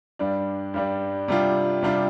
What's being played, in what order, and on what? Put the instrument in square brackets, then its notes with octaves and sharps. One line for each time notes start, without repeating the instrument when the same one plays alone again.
[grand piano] G2 G3 D4
G2 G3 D4
C3 G3 D4 F4
C3 G3 D4 F4